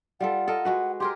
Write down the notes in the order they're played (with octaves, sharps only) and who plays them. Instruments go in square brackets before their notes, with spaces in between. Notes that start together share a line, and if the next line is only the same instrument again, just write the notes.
[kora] G3 F4 A4 [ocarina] F#5
[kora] A4 A#4 D#5
G#3 F#4 B4
[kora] G4 G#4 A#4 [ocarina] C6